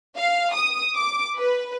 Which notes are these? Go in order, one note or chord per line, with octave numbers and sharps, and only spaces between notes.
F5
D#6
D6
B4